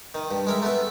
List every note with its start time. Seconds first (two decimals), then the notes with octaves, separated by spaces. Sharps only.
0.14 D#3
0.31 G2
0.47 G#3 A#4 E5
0.62 A3 B3 E5